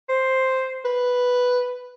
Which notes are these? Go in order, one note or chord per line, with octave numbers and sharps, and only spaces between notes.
C5
B4